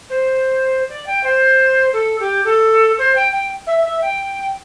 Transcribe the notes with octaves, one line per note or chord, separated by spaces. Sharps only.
C5
D5
G5
C5
A4
G4
A4
C5
G5
G5
E5
E5
G5